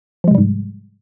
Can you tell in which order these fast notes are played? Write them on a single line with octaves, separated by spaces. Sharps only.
F3 G#3 C3 G3 G#2